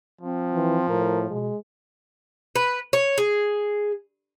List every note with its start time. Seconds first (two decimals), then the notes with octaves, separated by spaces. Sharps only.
0.21 F3 C4
0.54 E3
0.89 A2 A#4
1.30 B2 G#3
2.56 B4
2.93 C#5
3.18 G#4